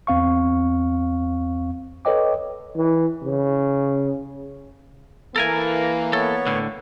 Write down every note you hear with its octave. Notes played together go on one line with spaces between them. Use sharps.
E2 C4 F5 C#6
A4 B4 C#5 D#5 G5 D6
E3
C#3
E3 A#3 A4 A#4 G#5
B3 A4 C#5
A2 D3